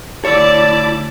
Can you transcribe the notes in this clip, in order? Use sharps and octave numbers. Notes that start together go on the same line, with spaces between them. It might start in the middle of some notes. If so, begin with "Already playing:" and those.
D2 E4 C#5 D5 A5 D6